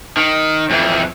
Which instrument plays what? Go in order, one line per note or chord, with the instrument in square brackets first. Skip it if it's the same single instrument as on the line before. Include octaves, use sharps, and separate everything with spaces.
[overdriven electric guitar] D#3
F2 E3